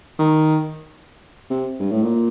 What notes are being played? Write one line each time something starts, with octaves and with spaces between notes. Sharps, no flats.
D#3
C3
G2
A2
A#2